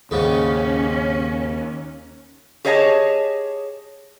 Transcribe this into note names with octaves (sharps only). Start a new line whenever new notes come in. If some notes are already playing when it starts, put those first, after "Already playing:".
D#2 G#2 C#3 G3 C#4
G4 G#4 C#5 D#5 E5 A5